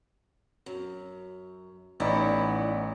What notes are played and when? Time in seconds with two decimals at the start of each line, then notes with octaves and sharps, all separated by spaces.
0.66 F#2
2.00 A1 B3 D#4 E4 C#5 D5